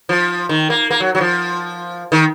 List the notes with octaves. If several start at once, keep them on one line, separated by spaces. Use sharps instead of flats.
F3
D#3
A#3
A#3
F#3
F#3
F3
D#3